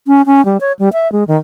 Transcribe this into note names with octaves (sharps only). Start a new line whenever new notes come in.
C#4
C#4
G3
C#5
G3
E5
G#3
D#3